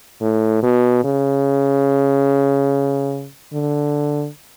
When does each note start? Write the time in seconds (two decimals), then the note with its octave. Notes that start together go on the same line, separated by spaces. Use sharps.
0.21 A2
0.63 B2
1.04 C#3
3.53 D3